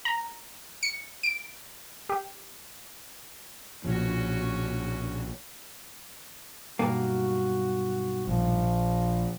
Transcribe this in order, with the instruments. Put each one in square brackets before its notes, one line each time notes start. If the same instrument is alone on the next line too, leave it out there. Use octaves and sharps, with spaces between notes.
[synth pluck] A#5
C#7
D7
G4
[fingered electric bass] B1 A#2 F3 [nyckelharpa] C#4 F#4
[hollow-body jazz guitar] B1 G2 A#3 [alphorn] F#4
[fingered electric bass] A#1 [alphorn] F3